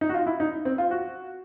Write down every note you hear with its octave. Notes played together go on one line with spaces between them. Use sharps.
D#4
F#4
F4
E4
D#4
C4
F4
F#4